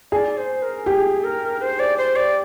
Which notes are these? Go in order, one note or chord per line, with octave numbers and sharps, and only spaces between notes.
G#4 D5
C5
A#4
G4 G#4
A#4
C5
D5
C5
D5